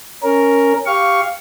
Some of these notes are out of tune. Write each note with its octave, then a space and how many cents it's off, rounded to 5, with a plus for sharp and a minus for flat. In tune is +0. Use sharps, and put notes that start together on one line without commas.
C#4 +0 A#4 +0
G4 +0 F5 +0 C#6 +5